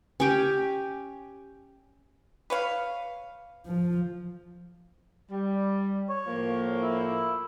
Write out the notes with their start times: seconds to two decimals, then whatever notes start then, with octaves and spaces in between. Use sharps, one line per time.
0.20 C#4 G4
2.50 B4 C#5 F5
3.66 F3
5.30 G3
6.09 C#5
6.26 A2 F3 A#3
6.81 E4